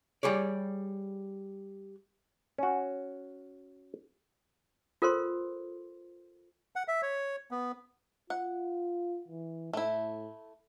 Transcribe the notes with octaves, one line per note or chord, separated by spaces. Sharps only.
G3 G#4 C#5 D5
C#4 F#4
F4 A4 A#4 C5 C6
F#5
E5
C#5
B3
F4 F#5
E3
A2 A3 E4